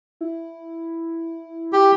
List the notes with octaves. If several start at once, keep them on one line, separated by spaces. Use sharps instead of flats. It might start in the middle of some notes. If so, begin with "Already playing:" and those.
E4
G4